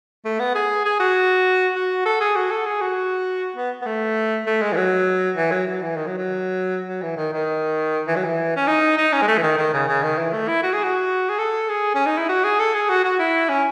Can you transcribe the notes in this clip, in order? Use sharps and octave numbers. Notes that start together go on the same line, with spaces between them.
A3
B3
G#4
G#4
F#4
F#4
A4
G#4
F#4
A4
G#4
F#4
B3
B3
A3
A3
G#3
E3
F#3
E3
F#3
F#3
E3
D#3
F#3
F#3
F#3
E3
D#3
D#3
E3
F#3
E3
C#4
D#4
D#4
C#4
G#3
A3
E3
D#3
D#3
C#3
C#3
D#3
E3
A3
E4
F#4
G#4
F#4
G#4
A4
G#4
C#4
D#4
E4
F#4
G#4
A4
G#4
F#4
F#4
E4
C#4